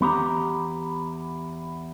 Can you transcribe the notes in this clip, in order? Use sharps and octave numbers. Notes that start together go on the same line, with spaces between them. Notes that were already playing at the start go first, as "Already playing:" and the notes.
E2 B3 G4 A#5